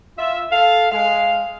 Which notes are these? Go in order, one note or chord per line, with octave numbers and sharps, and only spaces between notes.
F4 E5
A4 F5
G#3 F5